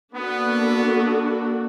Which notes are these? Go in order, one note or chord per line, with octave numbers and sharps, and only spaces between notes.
A#3 B3 D4 F#4 A4